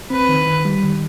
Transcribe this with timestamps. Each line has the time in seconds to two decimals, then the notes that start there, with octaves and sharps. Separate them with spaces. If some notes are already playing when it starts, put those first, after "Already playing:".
0.10 C4 B4
0.29 D#3
0.46 D#3
0.65 G3
0.83 D#3